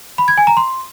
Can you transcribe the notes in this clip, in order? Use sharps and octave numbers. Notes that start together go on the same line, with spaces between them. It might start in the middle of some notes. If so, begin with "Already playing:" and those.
B5
G#6
G#5
A#5
C6